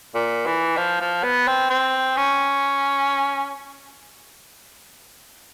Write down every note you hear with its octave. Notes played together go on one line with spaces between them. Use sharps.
A#2
E3
F3
F3
B3
C4
C4
C#4